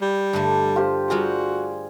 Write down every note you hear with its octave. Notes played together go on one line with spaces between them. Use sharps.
G3
G2 D3 A3
F4 G4 C5
G3 F4 F#4 G#4 A#4